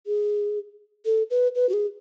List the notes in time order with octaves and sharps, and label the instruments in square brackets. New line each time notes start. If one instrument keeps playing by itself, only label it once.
[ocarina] G#4
A4
B4
B4
F#4
G#4